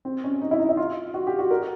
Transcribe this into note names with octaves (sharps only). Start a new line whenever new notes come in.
C4
C#4
D#4
E4
D#4
E4
F4
F#4
G4
F#4
A#4